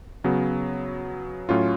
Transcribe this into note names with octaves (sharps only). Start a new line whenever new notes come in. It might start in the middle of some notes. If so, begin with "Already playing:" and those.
C#3 F#3 B3
A2 F#3 C#4 F4